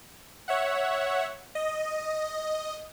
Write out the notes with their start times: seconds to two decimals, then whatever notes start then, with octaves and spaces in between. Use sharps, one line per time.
0.48 C#5 E5 F#5
1.55 D#5